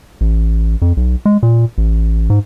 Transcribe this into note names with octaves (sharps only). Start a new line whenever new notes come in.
A1
F2
B1
G#3
A#2
A1
G#2